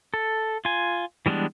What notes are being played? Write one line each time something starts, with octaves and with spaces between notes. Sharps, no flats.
A4
F4 G#5
E3 G3 G#3 B3 D4